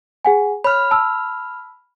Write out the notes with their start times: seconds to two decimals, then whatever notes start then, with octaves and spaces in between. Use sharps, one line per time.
0.25 G#4 F#5 G#5
0.64 C#5 B5 F6
0.91 A5 E6